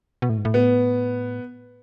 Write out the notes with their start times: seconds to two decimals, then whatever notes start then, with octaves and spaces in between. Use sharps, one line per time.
0.22 B2
0.29 A2
0.37 G#2
0.45 A2
0.54 B3